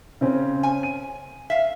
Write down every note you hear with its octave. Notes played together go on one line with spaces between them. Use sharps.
C#3 C4 C#4
G#5
D#7
E5 F5